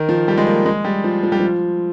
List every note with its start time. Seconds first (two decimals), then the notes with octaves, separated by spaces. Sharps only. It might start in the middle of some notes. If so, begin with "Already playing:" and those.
Already playing: D#3
0.09 F3
0.28 G3
0.38 G#3
0.47 A#3
0.66 G#3
0.85 G3
1.04 F3
1.23 F3
1.32 G3
1.40 F3